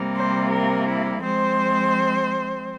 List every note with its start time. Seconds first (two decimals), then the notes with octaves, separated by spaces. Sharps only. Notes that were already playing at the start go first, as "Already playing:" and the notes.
Already playing: C3 G3 A#3
0.13 C5
0.50 A#4
0.87 E4
1.22 F3 G#3 C4 C5